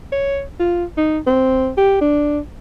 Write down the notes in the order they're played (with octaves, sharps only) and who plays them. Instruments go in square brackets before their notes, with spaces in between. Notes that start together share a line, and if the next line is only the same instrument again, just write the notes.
[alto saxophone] C#5
F4
D#4
C4
G4
D4